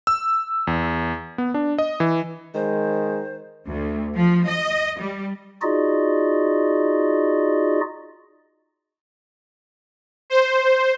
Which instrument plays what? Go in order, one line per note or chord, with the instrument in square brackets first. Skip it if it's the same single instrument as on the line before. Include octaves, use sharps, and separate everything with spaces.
[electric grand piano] E6
E2
B3
D4
D#5
E3
[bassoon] D#3 [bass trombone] G#3 [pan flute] C5
[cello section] D2
F3
D#5
G3
[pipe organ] D#4 F4 F#4 G#4 D5 D#5
[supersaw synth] C5